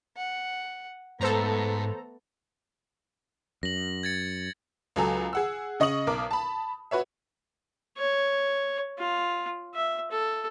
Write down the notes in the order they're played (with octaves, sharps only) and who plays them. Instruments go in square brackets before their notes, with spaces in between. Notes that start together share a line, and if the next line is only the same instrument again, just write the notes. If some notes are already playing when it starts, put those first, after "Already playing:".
[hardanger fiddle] F#5
[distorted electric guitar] G#2 [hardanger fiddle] A3 B3 [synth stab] A4 C5 A#5
[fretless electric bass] F#2 [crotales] A#6 F#7
[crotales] G#6 A6 C#7
[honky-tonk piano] C#2 F#3 A4 G#5 A#5
G#4 F#5 E6
C#3 D#5 C#6 D#6 F#7
B1 A#4 D6
A5 B5
F#4 B4 C#5 E5
[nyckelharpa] C#5
F4
E5
A4